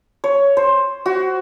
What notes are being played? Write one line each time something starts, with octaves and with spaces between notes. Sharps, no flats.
C#5
C5
F#4